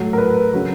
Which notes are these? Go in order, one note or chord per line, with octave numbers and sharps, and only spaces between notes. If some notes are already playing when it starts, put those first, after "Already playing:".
Already playing: A2 F#3 A4
A#4
B4
C#3 F#3